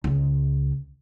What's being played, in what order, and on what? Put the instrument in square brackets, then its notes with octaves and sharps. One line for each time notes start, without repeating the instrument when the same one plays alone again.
[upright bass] C#2 G#3